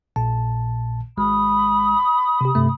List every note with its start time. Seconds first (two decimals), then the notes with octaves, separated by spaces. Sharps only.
0.16 A#1 A#2 A5
1.17 G#1 G#3 B5 D#6
2.41 C3 G4
2.55 G2 C3 A3